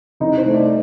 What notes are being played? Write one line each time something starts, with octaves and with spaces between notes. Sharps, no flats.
C2 D#4
C5
A3
D5